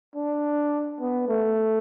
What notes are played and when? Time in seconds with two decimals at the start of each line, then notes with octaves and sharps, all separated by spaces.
0.15 D4
1.01 B3
1.28 A3